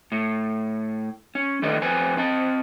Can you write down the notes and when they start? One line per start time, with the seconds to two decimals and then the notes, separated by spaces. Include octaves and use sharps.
0.12 A2
1.35 C#4
1.62 D3 D#3 A3 B4 D5 D#5
1.82 F2 C4 B4 G#5
2.17 C4 D#5 A5